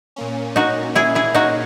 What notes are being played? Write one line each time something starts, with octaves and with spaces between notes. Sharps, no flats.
A#2 A#3 C#4
D#4 F#4
E4 G#4
E4 G#4
D#4 F#4